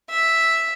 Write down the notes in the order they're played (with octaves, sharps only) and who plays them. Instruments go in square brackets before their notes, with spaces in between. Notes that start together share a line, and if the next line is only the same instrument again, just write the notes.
[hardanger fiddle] E5